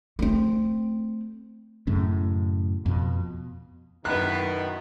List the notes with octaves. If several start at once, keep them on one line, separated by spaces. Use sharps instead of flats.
A3 C4
F#2 A2 C#3
F2 B2
F#2 B2 D#3 B3 E4 B4 F#6